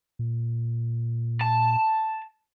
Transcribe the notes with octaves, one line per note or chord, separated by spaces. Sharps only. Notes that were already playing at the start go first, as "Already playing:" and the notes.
A#2
A5